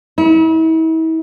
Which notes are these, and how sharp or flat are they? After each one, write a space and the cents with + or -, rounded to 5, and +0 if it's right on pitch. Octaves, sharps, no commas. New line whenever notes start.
E4 -40